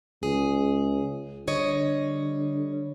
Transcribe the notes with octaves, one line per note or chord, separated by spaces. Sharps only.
C#2 G#4
D3 G3 C#5 D#5